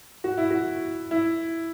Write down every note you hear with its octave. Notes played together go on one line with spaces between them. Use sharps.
F#4
E4
F#4
E4